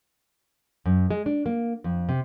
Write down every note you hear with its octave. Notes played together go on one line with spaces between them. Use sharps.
F#2
G#3
D4
A#3
F2
C3